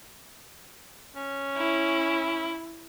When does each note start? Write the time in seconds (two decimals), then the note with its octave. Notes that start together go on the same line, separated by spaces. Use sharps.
1.16 C#4
1.57 E4